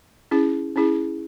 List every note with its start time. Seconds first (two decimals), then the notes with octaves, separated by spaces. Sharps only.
0.31 C#4 E4 G#4
0.76 C#4 E4 G#4